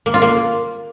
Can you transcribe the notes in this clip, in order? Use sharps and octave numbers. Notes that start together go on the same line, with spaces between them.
A#3
F4
A#3